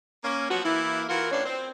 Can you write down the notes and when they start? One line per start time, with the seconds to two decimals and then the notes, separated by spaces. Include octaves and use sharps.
0.23 A#3 C#4
0.49 F3 F#3 B3 F#4
0.63 E3 A#3 E4
1.08 E3 F4 F#4 A#4
1.31 A2 D4 F4 B4 C#5
1.45 C4